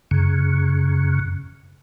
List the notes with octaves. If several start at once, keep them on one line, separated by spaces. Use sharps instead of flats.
F#2 C#3